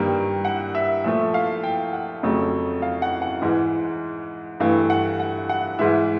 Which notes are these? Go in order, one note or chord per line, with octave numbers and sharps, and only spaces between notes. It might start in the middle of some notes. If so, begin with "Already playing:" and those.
Already playing: G2 D#3 G3 A#3
F#5
E5
A#2 F3 A3 E5
F5
G5
F#5
F2 C#3 F#3 A3
F5
F#5
F#5
G#2 E3 G#3
G2 E3 A3 F5
F#5
F#5
F#5
G#2 E3 G#3 E5